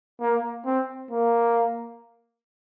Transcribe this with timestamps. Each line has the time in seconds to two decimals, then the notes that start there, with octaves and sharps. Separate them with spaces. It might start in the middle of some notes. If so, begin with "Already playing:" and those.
0.21 A#3
0.66 C4
1.11 A#3